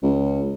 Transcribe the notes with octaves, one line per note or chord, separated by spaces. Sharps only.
C#2